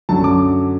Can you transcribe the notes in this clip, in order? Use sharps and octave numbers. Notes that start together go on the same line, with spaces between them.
F#2 D3 F#3 A5
D6